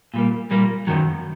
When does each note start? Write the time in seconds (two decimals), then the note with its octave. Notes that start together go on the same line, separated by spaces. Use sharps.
0.14 A#2 G3 A#3
0.51 A#2 G3 A#3
0.87 F#2 D#3 F#3